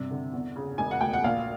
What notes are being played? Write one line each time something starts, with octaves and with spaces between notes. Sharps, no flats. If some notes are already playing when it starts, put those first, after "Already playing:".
Already playing: G2 C3
D3
E2
C#3
E1 G#5
F#5
D2 G5
F#5
A#1 F5